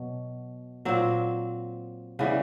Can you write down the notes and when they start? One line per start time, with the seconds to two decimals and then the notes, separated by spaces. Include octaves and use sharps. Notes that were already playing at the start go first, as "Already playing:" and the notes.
Already playing: B2 F#3
0.85 A#2 F#3 C4
2.19 C#3 E3 G3 B3